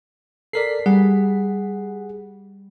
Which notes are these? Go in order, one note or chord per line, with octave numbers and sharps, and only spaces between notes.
A4 A#4 D5 B6 C7
G3 G#4 F#5